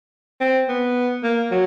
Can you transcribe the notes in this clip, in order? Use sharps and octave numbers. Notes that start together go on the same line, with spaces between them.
C4
B3
A#3
F#3